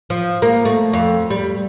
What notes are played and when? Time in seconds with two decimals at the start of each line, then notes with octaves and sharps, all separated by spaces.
0.10 F3
0.42 A#3
0.65 A3
0.93 F2
1.30 G3